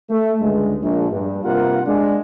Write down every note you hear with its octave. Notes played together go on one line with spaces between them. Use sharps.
A3
C#2 G2 D3 G#3
A#1
G2
G2 C3 A#3 F4 A#4 F#5
G#3 D4